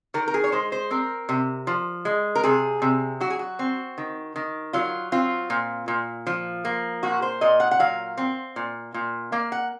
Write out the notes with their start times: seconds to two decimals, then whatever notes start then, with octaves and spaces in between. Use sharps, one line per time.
0.14 D#3 A#4
0.28 A#4
0.34 G#4
0.44 C#5
0.52 G#3 C5
0.72 C5
0.91 C4 A#4
1.29 C3
1.67 F3
2.05 G#3
2.35 A#4
2.44 C3 G#4
2.82 C3
3.20 F#3 F#4
3.30 G#4
3.39 F#4
3.59 C4
3.98 D#3
4.36 D#3
4.73 F#3 F4
5.12 C4 F4
5.50 A#2
5.88 A#2
6.27 F3
6.65 A#3
7.03 A#2 F#4
7.22 C5
7.41 A#2 D#5
7.60 F#5
7.71 F#5
7.79 F#3 F5
8.18 C4
8.56 A#2
8.94 A#2
9.32 A#3 F5
9.52 F#5